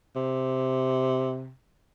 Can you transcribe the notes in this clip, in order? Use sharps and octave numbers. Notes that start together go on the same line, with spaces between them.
C3